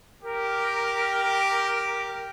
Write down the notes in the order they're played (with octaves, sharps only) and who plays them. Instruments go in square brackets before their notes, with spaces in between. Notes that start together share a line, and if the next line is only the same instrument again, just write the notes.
[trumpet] G4 [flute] A#4